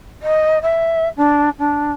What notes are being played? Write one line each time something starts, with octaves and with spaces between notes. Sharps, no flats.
D#5
E5
D4
D4